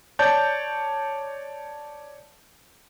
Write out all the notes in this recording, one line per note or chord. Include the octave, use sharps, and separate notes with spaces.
C#5 D5 A5 G6